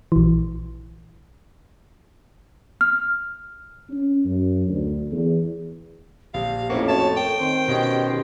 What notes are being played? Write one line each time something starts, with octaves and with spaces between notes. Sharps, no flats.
A#1 E3
F6
C#4
F#2
D2
E2
A#1 G4 F5
F2 A2 A#3 C#4 E4 F#4 C5
A3 F#4 C#5 A5
A#4 G5
D#3 C4 C5
B2 C#4 G4 D#5